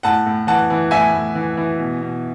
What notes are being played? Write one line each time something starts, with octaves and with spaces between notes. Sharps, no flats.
A2 F#5 A5
A2
E3 F#5 A5
E3
A2 E5 G#5
A2
E3
E3
B2
B2